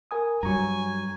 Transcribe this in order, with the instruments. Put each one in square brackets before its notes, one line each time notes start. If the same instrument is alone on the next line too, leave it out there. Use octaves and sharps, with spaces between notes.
[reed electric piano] A#4 G#5 D#6
[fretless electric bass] G2 F#3 [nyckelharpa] G#5 [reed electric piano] A#5 C#6